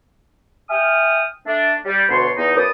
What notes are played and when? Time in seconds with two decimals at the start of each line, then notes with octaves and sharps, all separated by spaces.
0.69 E5 G5 G#5 D#6 F6
1.46 A3 D4
1.85 G3
2.09 D2 B2 B4 C#5 A5 C6
2.36 E2 D#4
2.56 F#2 B4 D5 A5 D6 D#6